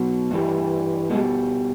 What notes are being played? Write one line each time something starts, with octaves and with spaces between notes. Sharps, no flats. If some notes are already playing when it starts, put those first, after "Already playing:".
Already playing: B2 F#3
G2 E3 G3
B2 G#3
G3